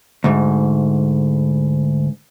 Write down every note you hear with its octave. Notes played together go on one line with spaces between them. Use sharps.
D2 G#2